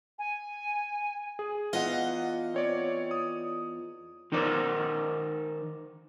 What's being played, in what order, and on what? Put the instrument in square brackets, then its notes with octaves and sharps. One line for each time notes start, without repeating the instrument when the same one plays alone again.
[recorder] G#5
[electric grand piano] G#4
[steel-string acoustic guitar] E2 F4 D#5 [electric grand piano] F5 F#5
[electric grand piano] C4 C#5 D5
D#6
[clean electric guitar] D#3 D#4 A#4 C5 D5